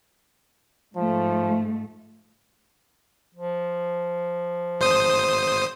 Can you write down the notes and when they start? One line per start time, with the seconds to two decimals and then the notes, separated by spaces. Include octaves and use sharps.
0.96 G#2 F3 A3
3.35 F3
4.80 G#1 C5 D#6